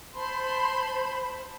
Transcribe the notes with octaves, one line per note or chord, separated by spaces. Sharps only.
C5 A5 B5 C6